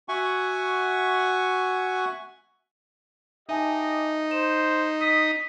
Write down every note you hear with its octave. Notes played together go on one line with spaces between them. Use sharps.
F#4 E5 F#5 G#5 C#6
D#4 G4 D#5 E5 G#5 A5
C5 E7
D#5 D#6 B6